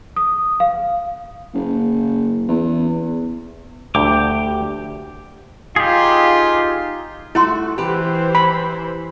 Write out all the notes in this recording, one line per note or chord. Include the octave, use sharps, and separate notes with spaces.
D#6
F5
F#1
E2
D2 G4 D6
D#4 F4 G4 G#4
A3 E4 F#4 C6
E3 G4 B4 C5
B5